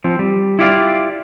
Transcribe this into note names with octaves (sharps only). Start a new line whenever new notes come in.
F3 C4
G3
E4 F4 G4 D5 F5